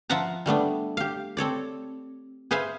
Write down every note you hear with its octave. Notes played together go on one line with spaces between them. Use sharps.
F3 F4 E5 F#5 A5 A#5
G3 A3 B3 D4
G4 F5
C4 A4 C#5 D5
G#4 B4 C5 E5 F5 G#5